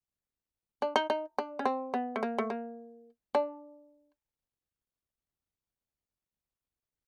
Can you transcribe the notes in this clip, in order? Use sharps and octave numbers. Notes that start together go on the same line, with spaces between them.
D4
D#4
D#4
D4
C#4
C4
B3
A3
A#3
A3
A#3
D4